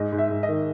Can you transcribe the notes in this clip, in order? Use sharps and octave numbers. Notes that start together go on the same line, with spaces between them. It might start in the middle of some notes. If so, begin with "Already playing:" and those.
Already playing: G#2 D#5
G#2
E5
G#2
D#5
D#3